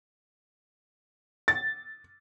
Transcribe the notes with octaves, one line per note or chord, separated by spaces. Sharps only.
A6